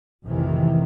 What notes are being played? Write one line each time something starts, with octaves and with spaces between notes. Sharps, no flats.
A1 F2 C3 D#3 E3